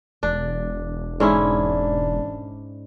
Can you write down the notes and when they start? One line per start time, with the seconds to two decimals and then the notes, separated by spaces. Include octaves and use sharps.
0.23 E1 D4
1.20 G#2 C#4 D4 E4